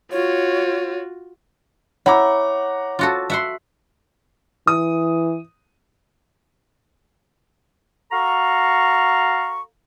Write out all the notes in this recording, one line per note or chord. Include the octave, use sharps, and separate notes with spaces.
F4 F#4 C#5
E4 C#5 F#5 A#5 D6
F4 F#4 A4
E5 F#5 C6
E3 D#6
F#4 A4 F5 A#5 C#6